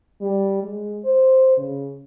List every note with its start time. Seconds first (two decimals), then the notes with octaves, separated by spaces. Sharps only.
0.21 G3
0.62 G#3
1.05 C5
1.57 C#3